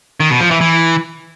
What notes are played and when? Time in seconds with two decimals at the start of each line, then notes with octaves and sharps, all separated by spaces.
0.20 D#3
0.30 B2
0.41 F3
0.51 E3
0.61 E3